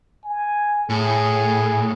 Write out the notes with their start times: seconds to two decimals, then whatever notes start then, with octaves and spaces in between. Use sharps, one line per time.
0.24 G#5
0.90 A2 G#4